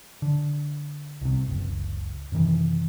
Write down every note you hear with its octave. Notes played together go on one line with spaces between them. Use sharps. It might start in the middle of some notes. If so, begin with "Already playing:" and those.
D3
C2 C3
F#1 C#2
F#2 C3 D#3 E3